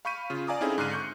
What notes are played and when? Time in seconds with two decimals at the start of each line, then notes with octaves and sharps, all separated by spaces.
0.05 F5 B5 C#6 G6 B6 D#7
0.30 C#3 F4
0.47 D5 F5 G#5 A#5 D6 D#6
0.61 C4 C#4 D#4 E4 G#4 A4
0.78 G#2 D3 F6 F#6 C7 D#7
0.92 C#6 G6 C#7